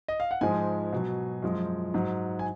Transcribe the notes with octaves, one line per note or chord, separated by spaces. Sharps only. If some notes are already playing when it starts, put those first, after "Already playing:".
D#5
F5
F#5
G#2 F3 G#3 G#5
B2 F#3
F#2 F3 G#3
G#2 F#3
G#5